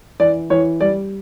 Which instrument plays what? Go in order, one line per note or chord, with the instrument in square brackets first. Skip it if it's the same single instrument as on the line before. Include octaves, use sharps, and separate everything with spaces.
[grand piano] E3 D5
E3 C#5
G3 D5